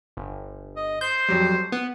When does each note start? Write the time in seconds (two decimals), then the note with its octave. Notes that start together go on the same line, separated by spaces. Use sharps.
0.17 G1
0.76 D#5
1.01 C5 G6
1.29 F2 F#3 G3
1.72 B3